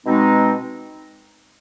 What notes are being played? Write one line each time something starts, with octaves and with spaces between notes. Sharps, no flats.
B2 G#3 C4 D#4